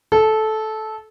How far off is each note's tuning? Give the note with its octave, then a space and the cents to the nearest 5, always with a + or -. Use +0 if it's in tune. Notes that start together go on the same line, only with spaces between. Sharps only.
A4 -15